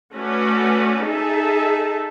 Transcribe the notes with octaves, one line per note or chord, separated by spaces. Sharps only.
A3 C#4 F#4 B4 D5
D#4 G#4 A4 E5 A5